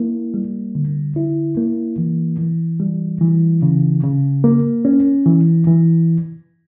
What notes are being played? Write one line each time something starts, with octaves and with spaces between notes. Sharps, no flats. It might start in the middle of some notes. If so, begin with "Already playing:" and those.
Already playing: A#3 E4
G3
D3
E4
A#3
E3
E3
G3
E3
C#3
C#3
A#3
C#4
E3
E3